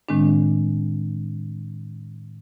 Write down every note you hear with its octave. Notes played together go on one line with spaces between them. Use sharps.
A2 D#3 G#3 C4 D4